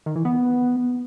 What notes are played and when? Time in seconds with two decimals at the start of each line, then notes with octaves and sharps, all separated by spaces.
0.06 D#3
0.16 E3
0.25 B3